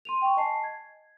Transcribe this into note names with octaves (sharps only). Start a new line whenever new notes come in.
C6 D#7 F7
G5 C#6
D#5 G#5 A5 C7
G#6